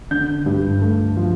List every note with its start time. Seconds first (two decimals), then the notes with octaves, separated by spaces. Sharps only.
0.11 D3 G6
0.46 G2
0.81 A3
1.17 F3